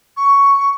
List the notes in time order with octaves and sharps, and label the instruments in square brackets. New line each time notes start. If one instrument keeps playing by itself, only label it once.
[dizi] C#6